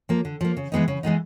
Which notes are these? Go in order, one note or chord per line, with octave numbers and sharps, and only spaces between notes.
F3 A#3
D3
F3 A#3
C#3
E3 G#3 B3 D#4
C#3
E3 G#3 B3 D#4